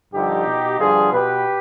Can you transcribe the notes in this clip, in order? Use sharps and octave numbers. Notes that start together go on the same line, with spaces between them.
G2 D3 F3 D#4 G4
B2
G2 D3 F3 F4 G#4
B2 G4 B4